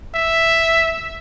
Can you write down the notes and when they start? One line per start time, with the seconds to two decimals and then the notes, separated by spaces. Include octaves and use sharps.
0.15 E5